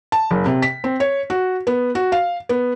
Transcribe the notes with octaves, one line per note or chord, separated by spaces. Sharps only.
A5
F#1
C3
B6
C4
C#5
F#4
B3
F#4
F5
B3